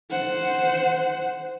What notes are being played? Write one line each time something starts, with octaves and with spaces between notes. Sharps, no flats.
C5 F#5